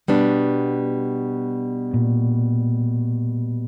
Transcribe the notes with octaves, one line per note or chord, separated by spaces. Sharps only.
B2 G3 B3 D4
A#2